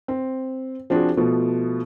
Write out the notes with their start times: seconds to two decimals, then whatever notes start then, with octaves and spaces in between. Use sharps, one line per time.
0.08 C4
0.90 F3 C4 D4 F#4 G#4
1.17 B2 F3 A3 B3